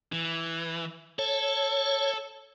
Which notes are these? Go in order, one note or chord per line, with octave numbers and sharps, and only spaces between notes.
E3
A4 C#5